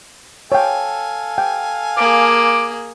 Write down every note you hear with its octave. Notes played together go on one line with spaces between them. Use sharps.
A4 C#5 F5 G5 G#5
G5
A#3 G#4 D6